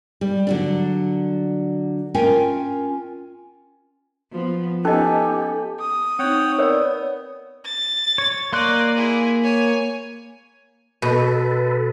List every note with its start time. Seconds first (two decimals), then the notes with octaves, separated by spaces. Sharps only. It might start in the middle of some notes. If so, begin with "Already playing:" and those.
0.21 G3
0.47 D3 F#3 D4
2.14 C#4 F4 A#4 E5 G5 G#5
4.32 F3 B3
4.85 B3 C#4 D#4 G4 A4 D#5 G#5
5.79 D#6
6.19 C4 D#4 C#5 F#5 G5
6.59 B3 A#4 C#5 D5
7.65 A6
8.18 C#5
8.53 A#3 D5 D#5 C6 F#6
8.96 E4 G#4
9.44 C#5 G#5
11.02 B2 A4 B4